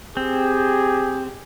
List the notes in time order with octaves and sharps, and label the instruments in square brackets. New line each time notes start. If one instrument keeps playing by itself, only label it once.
[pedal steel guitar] C4 [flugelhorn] G4 [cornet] G#4